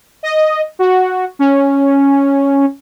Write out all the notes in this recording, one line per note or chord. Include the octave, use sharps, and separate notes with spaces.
D#5
F#4
C#4